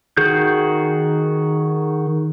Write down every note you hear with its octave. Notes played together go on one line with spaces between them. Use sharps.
D#3 F#4 G#4 G6